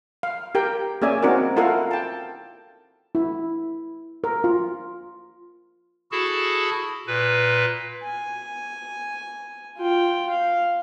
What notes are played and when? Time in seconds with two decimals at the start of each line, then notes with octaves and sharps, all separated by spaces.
0.23 F5
0.55 G4 A#4 G5
1.02 A#3 C#4 G#4 D5 E5 G#5
1.23 C4 D#4 F#4 A#4 D5
1.56 E4 F4 A4 A#4 F5 F#5
1.91 G5 A5
3.15 E4
4.24 A#4
4.44 F4
6.12 E4 F#4 G#4 A4 A5
7.07 A#2 B4
8.04 G#5
9.78 F4 G5
10.29 F5